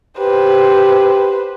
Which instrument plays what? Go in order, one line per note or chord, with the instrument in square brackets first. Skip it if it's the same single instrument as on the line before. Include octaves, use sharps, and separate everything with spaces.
[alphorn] G4 [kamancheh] B4 C5